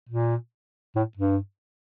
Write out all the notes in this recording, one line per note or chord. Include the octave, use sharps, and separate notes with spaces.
A#2
A2
G2